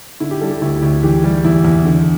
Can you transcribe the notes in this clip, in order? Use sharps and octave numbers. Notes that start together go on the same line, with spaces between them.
D3 E4
G4
G3 A4
G4
D2 E4
D2
E3 G4
G3
E2 E4
E2
D3